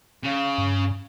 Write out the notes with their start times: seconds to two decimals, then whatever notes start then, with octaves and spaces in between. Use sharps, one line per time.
0.24 C#3
0.58 G2